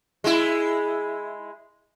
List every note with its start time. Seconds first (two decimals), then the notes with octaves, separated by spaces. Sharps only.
0.24 G#3 E4